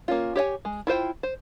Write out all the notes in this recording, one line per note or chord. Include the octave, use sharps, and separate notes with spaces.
A#3 C#4 F4
G4 C#5 D#5 G#5
G#3
E4 F4 C5 G5
C5